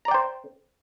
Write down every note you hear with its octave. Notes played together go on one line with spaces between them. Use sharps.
C5 D5 G5 A#5